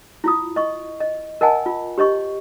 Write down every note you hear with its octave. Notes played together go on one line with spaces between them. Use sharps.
E4 F4 D#6
D#5 C#6
D#5
A#4 D#5 F#5 G#5 A5
F4
G4 C#5 D#5 C#6